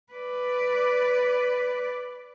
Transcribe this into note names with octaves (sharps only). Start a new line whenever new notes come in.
B4 D5